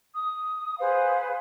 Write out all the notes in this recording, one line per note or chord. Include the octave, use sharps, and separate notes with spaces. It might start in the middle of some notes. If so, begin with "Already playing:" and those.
D#6
G#4 B4 C5 F5